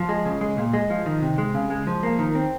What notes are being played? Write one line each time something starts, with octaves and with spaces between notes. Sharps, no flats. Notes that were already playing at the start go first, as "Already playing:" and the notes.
Already playing: F3
G#3
C#3
G#3
A#2
G#3
F3
D#3
C3
G#3
C#3
G#3
F3
A#3
D#3
C4